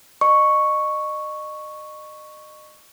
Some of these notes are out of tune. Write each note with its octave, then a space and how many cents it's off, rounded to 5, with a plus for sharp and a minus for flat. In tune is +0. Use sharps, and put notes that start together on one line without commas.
D#5 -35 C#6 +0